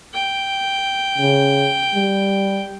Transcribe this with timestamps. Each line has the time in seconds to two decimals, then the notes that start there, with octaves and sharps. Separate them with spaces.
0.14 G5
1.18 C#3
1.94 G3